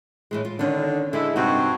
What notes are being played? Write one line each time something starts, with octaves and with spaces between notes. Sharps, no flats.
A2 E3 G#3
F4
D3 D#3 C#4 D4
D3 G#3 E4
G2 C3 C4 D#4 F#4